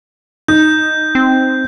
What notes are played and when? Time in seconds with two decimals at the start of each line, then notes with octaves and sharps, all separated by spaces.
0.48 D#4 G6
1.15 C4